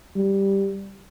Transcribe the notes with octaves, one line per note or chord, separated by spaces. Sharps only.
G3